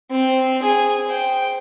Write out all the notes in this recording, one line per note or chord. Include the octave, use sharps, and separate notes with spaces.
C4
G#4 G#5
C5 G5